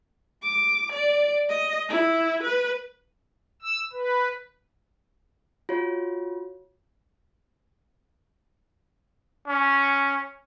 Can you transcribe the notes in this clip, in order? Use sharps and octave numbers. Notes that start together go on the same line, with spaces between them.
D6
D5
D#5
E4
B4
E6
B4
F4 F#4 C#5
C#4